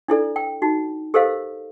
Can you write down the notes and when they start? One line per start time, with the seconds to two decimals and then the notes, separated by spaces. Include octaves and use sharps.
0.08 D4 E4 A4 D5
0.36 G5
0.62 D#4 F#4
1.14 G4 A4 A#4 C5 D#5 F5